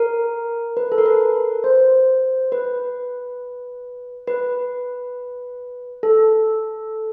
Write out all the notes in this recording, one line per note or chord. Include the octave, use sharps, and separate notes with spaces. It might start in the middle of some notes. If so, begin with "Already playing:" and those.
Already playing: A#4
B4
A4
A#4
B4
C5
B4
B4
A4